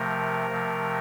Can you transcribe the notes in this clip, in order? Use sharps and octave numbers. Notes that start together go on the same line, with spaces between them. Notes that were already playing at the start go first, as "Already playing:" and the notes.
Already playing: C3 F3 A3 A#4
C3 F3 A3